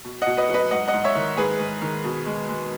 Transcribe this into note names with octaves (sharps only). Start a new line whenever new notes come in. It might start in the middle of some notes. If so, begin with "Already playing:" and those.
B2
B2 D#5 F#5
B4 D#5
F#3
B4 D#5
G#2 D#5 F#5
D#5 F#5
G#2
C#5 E5
D#3
G#2 G#4 B4
G#2
D#3
B2
G#3
G#3